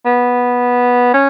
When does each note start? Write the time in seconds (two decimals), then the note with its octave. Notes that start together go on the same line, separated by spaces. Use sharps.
0.05 B3
1.14 C#4